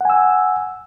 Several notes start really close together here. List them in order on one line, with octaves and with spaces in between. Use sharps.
F#5 G#5 E6